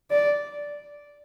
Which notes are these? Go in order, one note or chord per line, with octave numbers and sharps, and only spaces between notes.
D5